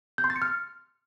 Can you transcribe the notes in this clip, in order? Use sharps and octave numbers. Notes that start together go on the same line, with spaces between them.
G6
C6
A6
C#7
F6